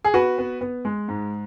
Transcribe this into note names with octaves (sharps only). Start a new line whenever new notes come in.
G#4
B3 F#4 B4
B3
B3
G#3
G#2